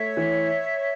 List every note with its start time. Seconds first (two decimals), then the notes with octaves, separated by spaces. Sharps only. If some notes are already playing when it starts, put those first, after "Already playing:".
Already playing: A3 C#5 E5
0.17 E3